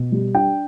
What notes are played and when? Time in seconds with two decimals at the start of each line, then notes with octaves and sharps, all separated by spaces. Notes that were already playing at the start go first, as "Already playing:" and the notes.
Already playing: B2
0.12 G3
0.35 D4 G5